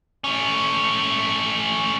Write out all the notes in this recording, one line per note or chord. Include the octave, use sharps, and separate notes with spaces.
A3 C#4